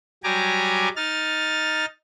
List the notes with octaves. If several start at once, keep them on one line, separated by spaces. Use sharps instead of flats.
F#3 G3 G4 G#5 A#5 D6
D#4 F6 A6